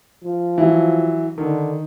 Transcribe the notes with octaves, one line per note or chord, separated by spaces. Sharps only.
F3
E3 F#3
D3 D#3